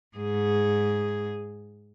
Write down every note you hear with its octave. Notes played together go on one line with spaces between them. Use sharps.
G#2 G#4